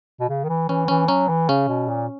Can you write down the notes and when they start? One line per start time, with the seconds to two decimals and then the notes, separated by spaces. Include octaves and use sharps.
0.20 B2
0.29 C#3
0.44 D#3
0.49 E3
0.69 E3 C#4
0.88 E3 C#4
1.08 F#3 C#4
1.29 E3
1.48 C#3 C#4
1.68 B2
1.88 A#2